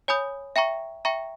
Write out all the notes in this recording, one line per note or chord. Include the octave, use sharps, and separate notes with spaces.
C#5 G#5 B5 D#6 G6
E5 G5 A#5 C#6
E5 G5 A#5 C#6